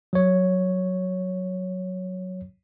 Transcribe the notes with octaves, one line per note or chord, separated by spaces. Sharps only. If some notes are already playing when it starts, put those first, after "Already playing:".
F#3 C#5